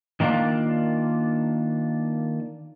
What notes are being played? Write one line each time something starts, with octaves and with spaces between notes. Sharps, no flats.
D#3 A#3 D4 F4